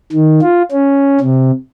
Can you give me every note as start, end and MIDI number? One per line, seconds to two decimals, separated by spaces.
0.12 0.40 51
0.42 0.62 65
0.71 1.19 61
1.21 1.51 48